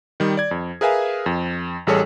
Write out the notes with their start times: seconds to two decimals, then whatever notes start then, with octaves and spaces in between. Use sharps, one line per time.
0.20 D#3 G3
0.37 D5 G#6
0.51 F2
0.81 G#4 A#4 B4 E5 F5 G#5
1.26 F2
1.87 A1 G3 G#4 A4 C#5